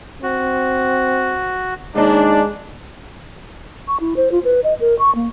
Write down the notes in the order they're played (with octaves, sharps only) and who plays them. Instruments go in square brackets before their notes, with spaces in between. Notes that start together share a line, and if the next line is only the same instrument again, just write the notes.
[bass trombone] C4 [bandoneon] F#4
[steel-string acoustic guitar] D#2 D#4 [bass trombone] G#3 [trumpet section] D4
[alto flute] C#6
E4
C5
F4
B4
D#5
A#4
C#6
A#3